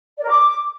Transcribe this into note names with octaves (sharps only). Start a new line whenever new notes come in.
D5
A#4
D6